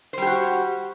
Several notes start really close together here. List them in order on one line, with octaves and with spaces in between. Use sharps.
C5 G3 G4 F#4